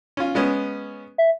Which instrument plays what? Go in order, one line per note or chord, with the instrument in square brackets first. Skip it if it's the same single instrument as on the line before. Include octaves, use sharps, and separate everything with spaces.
[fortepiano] C#4 F4
G#3 B3 C#4
[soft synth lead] E5